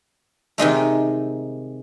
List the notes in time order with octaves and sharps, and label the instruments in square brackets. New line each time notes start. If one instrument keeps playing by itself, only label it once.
[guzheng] C3 D#3 G#3 A3